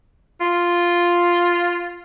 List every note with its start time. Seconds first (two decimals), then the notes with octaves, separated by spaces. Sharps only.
0.41 F4